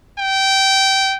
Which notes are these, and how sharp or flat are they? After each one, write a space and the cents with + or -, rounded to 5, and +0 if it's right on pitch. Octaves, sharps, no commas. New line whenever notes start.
G5 -20